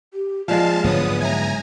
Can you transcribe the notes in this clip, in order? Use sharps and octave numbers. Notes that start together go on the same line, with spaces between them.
G4
F3 G#3 D5 F5 A5
G#2 D3 F#3 B3 C#5 D#6
E5 G#5 A#5